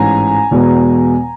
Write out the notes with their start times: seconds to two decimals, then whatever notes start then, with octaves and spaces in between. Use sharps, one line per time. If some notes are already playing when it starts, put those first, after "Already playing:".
Already playing: A1 G#2 E3 G#5 A#5
0.51 E2 B2 G#3